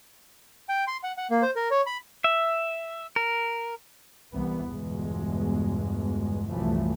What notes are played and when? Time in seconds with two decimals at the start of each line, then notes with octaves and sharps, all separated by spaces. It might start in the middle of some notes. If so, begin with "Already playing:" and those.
0.69 G5
0.87 C6
1.03 F#5
1.18 F#5
1.31 A#3
1.42 C5
1.56 A#4
1.71 C#5
1.86 B5
2.24 E5
3.16 A#4
4.32 C2 E3 B3
4.68 G1 E2 B2 G#3
6.49 C2 F#2 A2 E3 F3 A3